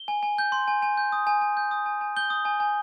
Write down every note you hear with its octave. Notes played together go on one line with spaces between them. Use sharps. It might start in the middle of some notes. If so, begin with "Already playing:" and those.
Already playing: G7
G#5
G#5
G6
C6
G#5
G#5
G6
D#6
G#5
G#5
G6
D#6
G#5
G#5
G6 G7
D#6
G#5
G#5